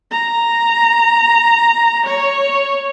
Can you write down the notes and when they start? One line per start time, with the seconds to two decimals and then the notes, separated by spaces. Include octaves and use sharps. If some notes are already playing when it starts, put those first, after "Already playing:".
0.11 A#5
2.07 C#5